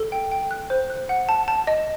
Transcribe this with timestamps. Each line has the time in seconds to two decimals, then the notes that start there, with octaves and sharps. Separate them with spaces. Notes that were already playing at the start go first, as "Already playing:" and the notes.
Already playing: A4
0.12 G5
0.32 G5
0.51 F#6
0.70 C5
0.90 F#6
1.09 F#5
1.29 A5
1.48 A5
1.67 D#5